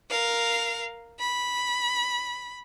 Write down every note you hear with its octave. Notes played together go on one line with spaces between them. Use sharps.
A#4 F5
B5